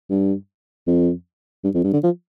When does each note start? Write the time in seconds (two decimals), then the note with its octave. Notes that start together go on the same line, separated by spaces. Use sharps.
0.10 G2
0.87 F2
1.64 G2
1.74 F2
1.84 G2
1.93 D3
2.04 F3